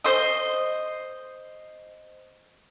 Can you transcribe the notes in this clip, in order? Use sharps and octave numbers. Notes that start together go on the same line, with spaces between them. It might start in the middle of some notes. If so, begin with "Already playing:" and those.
C5 D#5